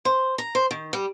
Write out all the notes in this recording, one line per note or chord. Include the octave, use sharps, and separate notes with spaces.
C5
A#5
C5
D#3
G3